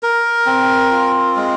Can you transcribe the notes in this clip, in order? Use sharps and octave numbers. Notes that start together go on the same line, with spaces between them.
A#4
C4
F4
G#3